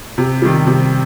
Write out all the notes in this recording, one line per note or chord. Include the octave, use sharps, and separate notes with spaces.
C3
D#3 G3
C3